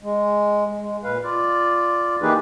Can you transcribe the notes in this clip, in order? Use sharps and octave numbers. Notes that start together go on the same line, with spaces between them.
G#3
G#3
A#2 B4 F5
F4 D5
E3 A#3 D#4 G4 G#4 B4